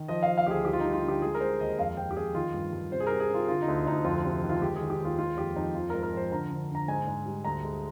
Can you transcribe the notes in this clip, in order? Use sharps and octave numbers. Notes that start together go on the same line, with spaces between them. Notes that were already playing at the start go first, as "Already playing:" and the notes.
Already playing: D#3
F3 D#5
F3 F5
F5
D2 G4 G#4
G3 G4
F4
G3 D#4
F4
D3 G4
G#3 G#4
A#4
G#3 C5
D#2 D#5
F2 F5
F2 G5
G4
F2 G#4
D#3 F4
G2
G2
C3 C5
G#4
G3 A#4
G#4
C3 F4
D3 F4
D#4
D2
D2 D#4
F2 F4
C3
D#3
F4
G#3 G4
G#4
D#3
G4
D#2
F4
G#3 F4
F2 G4
F2 D#4
F3 F4
G#2 A#4
A#4
F3 C5
D3 A#5
D3
D3 A#5
G#2 G#5
G#2
G3
D2 A#5
G#3